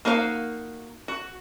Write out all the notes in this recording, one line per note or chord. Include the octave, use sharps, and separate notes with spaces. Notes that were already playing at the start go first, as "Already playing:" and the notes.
A#3 D#4 F#4 C#5 F5
F#4